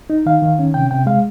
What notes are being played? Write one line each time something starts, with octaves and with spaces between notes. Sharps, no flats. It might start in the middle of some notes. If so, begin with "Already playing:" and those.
D#4
D#3 F5
D#3
C#4
C3 G5
C3 G5
G#3 F5